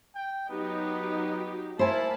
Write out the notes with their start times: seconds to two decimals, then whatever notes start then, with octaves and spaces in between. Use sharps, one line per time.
0.15 G5
0.50 F#3 B3 D#4 G4
1.79 A#3 E4 C5 G#5 A5 B5